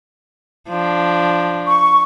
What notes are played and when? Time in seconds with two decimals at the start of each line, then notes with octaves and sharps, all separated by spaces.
0.68 F3 D4
1.67 C#6